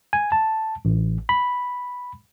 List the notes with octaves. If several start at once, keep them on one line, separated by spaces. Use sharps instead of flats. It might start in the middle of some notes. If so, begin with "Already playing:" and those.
G#5
A5
A1
B5